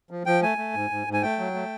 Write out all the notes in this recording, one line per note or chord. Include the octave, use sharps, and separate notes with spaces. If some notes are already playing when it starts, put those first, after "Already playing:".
F3
F3 G5
A3 G#5
A3
G#2
G#2
G#2
G#5
A3 G5
F#3
A3